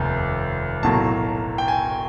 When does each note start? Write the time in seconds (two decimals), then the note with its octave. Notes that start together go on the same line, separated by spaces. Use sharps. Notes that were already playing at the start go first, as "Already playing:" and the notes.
Already playing: F1 D#2
0.82 B1 A2 F#3 A#3 A5
1.58 G5
1.68 G#5